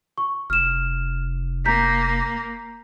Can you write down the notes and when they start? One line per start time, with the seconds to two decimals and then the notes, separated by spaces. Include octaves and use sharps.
0.18 C#6
0.50 F1 F6 E7
1.65 A#3 A#5 G6 B6